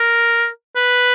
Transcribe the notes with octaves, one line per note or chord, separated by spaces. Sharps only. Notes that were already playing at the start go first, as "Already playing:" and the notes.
Already playing: A#4
B4